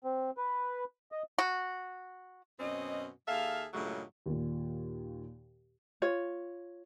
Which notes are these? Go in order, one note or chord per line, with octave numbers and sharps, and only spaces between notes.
C4
B4
D#5
F#4
F#2 B2 C4 C#4 D#5
D#2 G#4 A4 E5 F5
G2 A#2 C#3 F#3 G#3 A3
D#2 A#2
F4 C#5